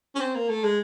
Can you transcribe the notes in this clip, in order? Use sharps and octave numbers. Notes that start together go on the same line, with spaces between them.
C#4
C4
A#3
A3
G#3